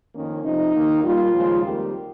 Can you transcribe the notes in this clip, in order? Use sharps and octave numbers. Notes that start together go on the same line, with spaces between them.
F2 D#3 A#3 C#4
F2 C3 F3 D#4
D#2 D#3 A#3
A#2 G3 A#3 F4
D#2 C#3 F3 G#3
F2 D#3 G3 A#3 G4